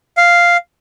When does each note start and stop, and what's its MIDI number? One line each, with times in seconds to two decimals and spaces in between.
0.17 0.57 77